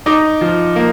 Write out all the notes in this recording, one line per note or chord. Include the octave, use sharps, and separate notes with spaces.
D#4 D6
F3
A#3